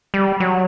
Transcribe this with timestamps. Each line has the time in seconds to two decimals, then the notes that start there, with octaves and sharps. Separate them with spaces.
0.14 G3
0.40 F#3